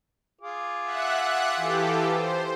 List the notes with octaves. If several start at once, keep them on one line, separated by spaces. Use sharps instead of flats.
F4 G#4 D6
E5 F#5 F#6
E3 G4 A4
C5